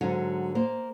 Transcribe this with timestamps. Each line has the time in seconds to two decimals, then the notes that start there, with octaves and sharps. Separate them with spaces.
0.01 G#2 D3 F#3
0.55 A#3 C5